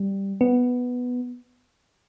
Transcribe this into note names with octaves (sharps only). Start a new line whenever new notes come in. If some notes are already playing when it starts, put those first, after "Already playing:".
Already playing: G3
B3